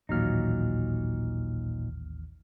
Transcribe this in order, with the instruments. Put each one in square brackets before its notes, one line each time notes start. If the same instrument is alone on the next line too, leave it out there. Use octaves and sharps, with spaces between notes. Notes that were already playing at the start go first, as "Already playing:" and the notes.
[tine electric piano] A1 D#2 F6 [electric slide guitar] A#2 F#3 D#4